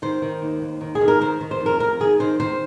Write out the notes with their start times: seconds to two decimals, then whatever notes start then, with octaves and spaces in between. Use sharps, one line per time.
0.02 D#3 C5
0.22 D#3
0.42 D#2
0.62 D#2
0.81 D#3
0.95 G#4
1.01 D#3
1.08 A#4
1.21 D#3 C5
1.41 D#3
1.51 C5
1.61 F2
1.66 A#4
1.80 F2 A#4
2.00 D#3 G#4
2.20 D#3 C5
2.40 D#3 C5